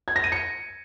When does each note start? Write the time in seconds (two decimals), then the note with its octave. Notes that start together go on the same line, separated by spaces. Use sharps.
0.08 G#6
0.16 A#6
0.24 D#7
0.32 C#7